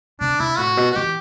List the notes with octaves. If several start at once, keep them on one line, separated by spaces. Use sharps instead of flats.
C3 D4
C3 E4
A2 F#4
B2
F#4
E3 G4